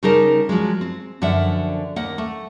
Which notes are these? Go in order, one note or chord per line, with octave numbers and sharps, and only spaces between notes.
C#3 G3 D#4 G#4 A#4 A5
F3 F#3 G#3
C4
F#2 D3 F3 D5 E5 F#5
D#2 A#3 F#5
A3